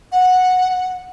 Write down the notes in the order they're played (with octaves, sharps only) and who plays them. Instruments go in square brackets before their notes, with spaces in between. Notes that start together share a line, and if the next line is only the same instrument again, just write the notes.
[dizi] F#5